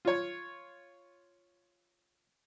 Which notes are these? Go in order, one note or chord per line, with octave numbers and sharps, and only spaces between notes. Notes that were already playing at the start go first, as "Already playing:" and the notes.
F4 C#5